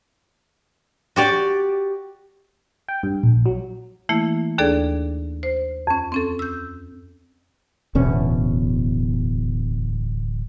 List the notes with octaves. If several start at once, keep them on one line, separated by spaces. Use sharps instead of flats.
F#4 G4 D5
G5
G2
A#1
F#3
E3 A3 A#3 E4
D#2 D4 G#4 A4 D5
C5
F2 C#4
C4 C#4 A4
E6 G6
D1 E2 B2 C#4